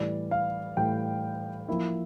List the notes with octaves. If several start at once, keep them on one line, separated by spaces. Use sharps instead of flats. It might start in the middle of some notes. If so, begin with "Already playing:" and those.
Already playing: A2 E3 G3 D5
F5
A2 E3 G3 G5
F3 A#3 E4